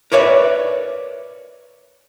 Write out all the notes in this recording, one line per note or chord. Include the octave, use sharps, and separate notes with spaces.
A#4 B4 C#5 D5 E5